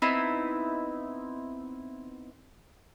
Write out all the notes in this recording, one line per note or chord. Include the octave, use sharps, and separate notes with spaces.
B3 C4 D#4 E4